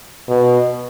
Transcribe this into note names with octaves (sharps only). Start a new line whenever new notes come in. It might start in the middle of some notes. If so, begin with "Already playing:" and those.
B2